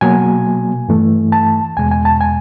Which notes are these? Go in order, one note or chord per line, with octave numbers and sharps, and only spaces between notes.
B2 F#3 A#3 G#5
G2 E3 A3
A5
E2 B2 G#3 G#5
G#5
A5
G#5